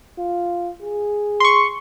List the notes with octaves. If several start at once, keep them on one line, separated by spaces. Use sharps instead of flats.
F4
G#4
C6 C#6